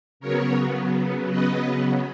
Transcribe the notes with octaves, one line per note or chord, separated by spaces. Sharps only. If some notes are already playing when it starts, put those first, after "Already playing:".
C#3 F#3 B3 A#4 C#5
B4 D#5